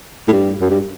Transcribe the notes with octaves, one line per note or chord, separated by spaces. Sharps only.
A2
G2
F#2
G2